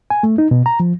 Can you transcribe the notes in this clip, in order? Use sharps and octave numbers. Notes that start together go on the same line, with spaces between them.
G#5
A3
D#4
B2
A#5
F3